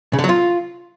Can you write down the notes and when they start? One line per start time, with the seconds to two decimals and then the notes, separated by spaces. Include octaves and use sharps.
0.13 C#3
0.19 D3
0.24 F#3
0.29 F4